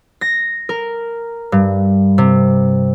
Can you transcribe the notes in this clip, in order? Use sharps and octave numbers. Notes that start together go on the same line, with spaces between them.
A#6
A#4
G2
C3